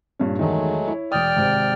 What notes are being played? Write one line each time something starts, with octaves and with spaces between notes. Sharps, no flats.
G2 A#2 C#4
E2 D#3 F#3 G#3 A3
E4 C#5
E1 D5 G5 D#6 F6
G#1 G#2 C3